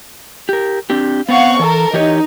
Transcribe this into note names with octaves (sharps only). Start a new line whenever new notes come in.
G4 A#4
C4 D4 G4
B3 C4 F5 F#5 C#6
E3 A4 A#4
E3 D#4 G4 C#5